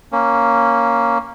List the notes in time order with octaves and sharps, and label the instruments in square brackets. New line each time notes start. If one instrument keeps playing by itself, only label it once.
[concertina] A#3 C#4